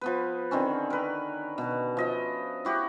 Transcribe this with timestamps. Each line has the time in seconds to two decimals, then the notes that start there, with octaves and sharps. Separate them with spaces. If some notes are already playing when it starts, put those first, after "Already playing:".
0.01 F3 B3 B4
0.51 D3 D#3 C4 C#4
0.90 A#4 B4
1.58 B2
1.97 F3 D#5 E5
2.65 E4 F#4 G4